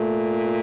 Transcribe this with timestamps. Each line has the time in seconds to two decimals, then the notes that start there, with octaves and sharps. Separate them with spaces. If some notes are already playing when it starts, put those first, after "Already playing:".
Already playing: A#2 A3